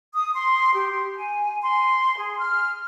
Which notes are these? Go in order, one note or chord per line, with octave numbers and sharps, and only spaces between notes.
D#6
C6
G4
G#5
C6
G#4
F6